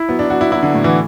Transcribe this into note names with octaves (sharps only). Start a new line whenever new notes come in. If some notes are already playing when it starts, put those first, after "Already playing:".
Already playing: E4
F#3 B3
D4
F#3 F#4
E4
F#3 E4
D3
A2
E3